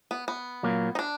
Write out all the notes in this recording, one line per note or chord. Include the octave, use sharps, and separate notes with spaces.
B3
B3
A#2 F#3 A#3
D#4
D4